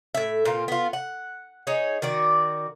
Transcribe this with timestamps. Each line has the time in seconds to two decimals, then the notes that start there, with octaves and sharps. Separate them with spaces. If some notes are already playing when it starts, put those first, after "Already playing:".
0.15 A2 E5
0.45 A#2 C4 F4
0.68 B3 F4
0.93 F#5
1.67 D#4 G#4 C#5
2.02 D#3 F#4 D5